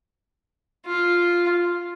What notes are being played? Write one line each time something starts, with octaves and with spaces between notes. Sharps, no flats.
F4